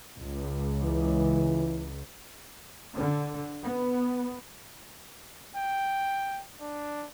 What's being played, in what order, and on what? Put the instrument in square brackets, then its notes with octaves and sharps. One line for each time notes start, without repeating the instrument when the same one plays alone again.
[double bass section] C#2
[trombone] E3
[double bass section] D3
B3
[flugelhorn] G5
D4